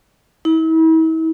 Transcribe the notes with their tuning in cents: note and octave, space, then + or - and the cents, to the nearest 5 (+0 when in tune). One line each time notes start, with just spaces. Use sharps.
E4 -40